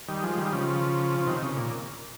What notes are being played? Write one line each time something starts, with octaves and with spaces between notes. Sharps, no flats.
D#3 G3
F3 G#3
D#3 G3
C#3 F3
C#3
C3 D#3
C#3
A#2